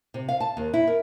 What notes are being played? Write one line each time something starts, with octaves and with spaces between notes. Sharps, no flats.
C3
F5
A5
D#2
E4
A#4